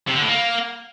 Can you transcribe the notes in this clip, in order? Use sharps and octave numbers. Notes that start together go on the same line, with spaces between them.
C3
D3
A2
A#3